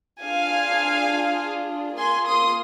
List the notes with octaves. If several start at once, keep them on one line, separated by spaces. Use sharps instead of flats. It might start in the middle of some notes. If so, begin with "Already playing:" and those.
D4 F4 G#4 F5 G#5
A#3 F4 G#4 G#5 C6
C6 D#6